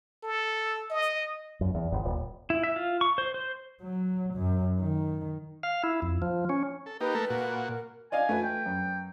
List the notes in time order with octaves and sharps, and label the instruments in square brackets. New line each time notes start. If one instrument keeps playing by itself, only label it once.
[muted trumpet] A4
D#5
[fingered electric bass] F#2
E2
G1
D#1
[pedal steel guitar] E4
E5
F4
C#6
C5
C5
[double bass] F#3
F#2
D#3
[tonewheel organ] F5
E4
F2
F3
C#4
[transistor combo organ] A4
[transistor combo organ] A#3 D#4 G4 [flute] B4
[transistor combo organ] A3 A4 A#4
A#2 F#4
[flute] A#4
[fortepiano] D5 D#5 F5 [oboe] G#5
[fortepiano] A3 B4
[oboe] G5
[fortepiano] F#2